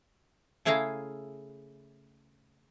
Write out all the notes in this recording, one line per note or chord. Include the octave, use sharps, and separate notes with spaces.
C#3 A3 E4 G#4 F5 A#5